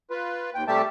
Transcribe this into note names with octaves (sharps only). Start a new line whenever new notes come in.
F4 B4
D#2 G5
C3 G3 A3 G4 E5 A5